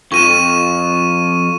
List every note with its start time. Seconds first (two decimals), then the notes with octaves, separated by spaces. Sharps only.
0.12 F2 C#6 D#7 E7